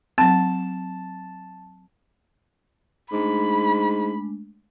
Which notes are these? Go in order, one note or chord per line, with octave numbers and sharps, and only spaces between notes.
F#3 C4 A5
G#2 G#3 A3 D4 B5